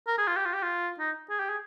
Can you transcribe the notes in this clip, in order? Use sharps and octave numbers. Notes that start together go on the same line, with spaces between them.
A#4
G#4
F4
G4
F4
G4
F4
D#4
G#4
G4
G#4